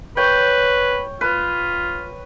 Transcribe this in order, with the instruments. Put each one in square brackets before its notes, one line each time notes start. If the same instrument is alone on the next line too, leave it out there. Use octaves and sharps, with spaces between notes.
[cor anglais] B4 [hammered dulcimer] C#5 G5
[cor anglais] F4 [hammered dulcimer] B4